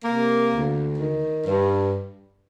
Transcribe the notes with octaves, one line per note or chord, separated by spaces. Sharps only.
C3 A#3
D2
D#3
G2